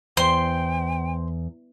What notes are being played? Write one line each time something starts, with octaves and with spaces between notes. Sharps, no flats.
E2 C5 G5 C6